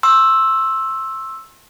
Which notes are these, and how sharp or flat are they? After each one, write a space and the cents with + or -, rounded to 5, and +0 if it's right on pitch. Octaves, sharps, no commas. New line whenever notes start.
C6 +35 E6 +0